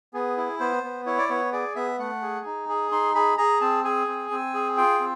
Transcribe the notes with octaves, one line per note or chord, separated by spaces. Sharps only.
B3 G#4
E4
B3 C5
B3
E4 C#5
D5
B3 C#5
G#4 D5
B3 E5
A3 F#5
G#4
D#4
G#4
D#4 C6
G#4 B5
G#4 A#5
C4 A5
G#4 G#5
C4
C4
G#4
F4 G5
C4